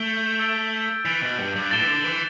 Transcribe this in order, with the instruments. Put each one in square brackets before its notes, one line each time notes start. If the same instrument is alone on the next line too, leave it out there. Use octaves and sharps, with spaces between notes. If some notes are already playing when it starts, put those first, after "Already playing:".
Already playing: [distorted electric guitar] A3 [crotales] G6 D7 G7
[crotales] E6 A6 D7 G7
[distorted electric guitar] E3 [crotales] E6 A6 D7 G7
[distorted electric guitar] B2
G2
G2
[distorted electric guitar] A2 [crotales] A6 E7 G7
[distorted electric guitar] E3
D3
E3